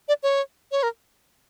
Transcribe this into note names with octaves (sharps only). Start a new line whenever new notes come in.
D5
C#5
C#5
A#4